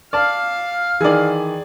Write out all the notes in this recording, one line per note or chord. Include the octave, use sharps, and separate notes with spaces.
D5 F5 A5 F6
D#3 E3 G#4 D5